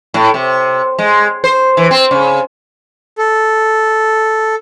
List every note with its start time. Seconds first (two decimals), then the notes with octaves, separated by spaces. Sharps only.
0.14 A2
0.34 C3
0.99 G#3
1.44 C5
1.77 E3
1.91 C4
2.11 C#3
3.18 A4